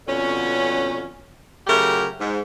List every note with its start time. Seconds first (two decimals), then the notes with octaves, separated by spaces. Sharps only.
0.07 F2 B2 D3 C#4
1.67 C#3 F#3 A3 G4 A#4
2.19 G#2